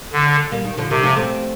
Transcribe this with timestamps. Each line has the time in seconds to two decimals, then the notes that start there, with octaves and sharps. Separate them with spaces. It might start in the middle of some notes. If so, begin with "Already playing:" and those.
0.13 D3
0.52 G3 A#3
0.65 D#3
0.77 D3 F3
0.90 C3 D#3 G3
1.03 F3 A3
1.17 A3 C4